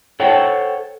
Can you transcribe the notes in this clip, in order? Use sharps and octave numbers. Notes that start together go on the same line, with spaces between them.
A4 C5 C#5 F#5 G5